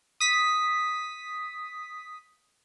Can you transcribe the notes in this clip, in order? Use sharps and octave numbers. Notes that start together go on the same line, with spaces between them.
D#6 B6